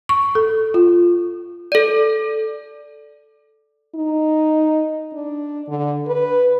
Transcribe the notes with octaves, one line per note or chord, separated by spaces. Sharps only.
C#6
A4
F4
A4 D5
D#4
D4
D3
B4